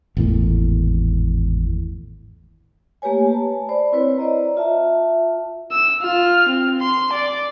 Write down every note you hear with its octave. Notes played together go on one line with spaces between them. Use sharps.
G#1 E2 A2
A3 A#3 G4 B4 C#5 G#5
A5
C5 D5 B5
C4 E4 B4 C#5
C5 D5 D#5 A#5
F4 E5 A5
E6
F4 F6
C4
C6
D5